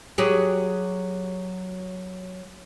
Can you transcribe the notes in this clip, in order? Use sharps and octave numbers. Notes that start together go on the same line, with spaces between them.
F#3 G4 G#4